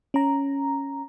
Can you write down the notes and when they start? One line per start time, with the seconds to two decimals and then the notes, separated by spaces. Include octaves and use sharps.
0.14 C#4 A#5